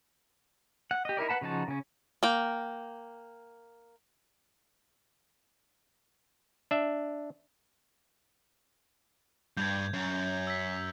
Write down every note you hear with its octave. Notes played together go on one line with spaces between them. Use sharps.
F#5
G4 D#5
D#4 E4 A#4 D5
B4 F#5 A5 B5
C#3 F3 D#4 F#4 A5
C#3 C#4
A#3 G5
D4 E5
G2 G6 G#6
F#2
E6 B6